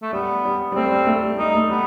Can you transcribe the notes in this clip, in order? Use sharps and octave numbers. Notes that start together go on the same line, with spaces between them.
A3
G3 B3
G3
G3
A3 C4
G3
A3
G3
G3 D#4
A3
G3 B3